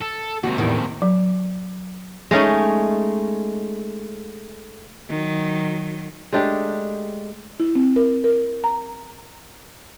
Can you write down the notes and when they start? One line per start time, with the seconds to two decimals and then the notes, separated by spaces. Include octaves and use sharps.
0.01 A4
0.43 D#2 C3 F#4
0.58 E2 A2 D#3
1.02 F#3
2.31 G#3 A3 C#4 D#4
5.09 D#3 F#3
6.33 G#3 A3 D4 G4
7.60 E4
7.75 C4
7.96 A#4
8.24 A#4
8.64 A#5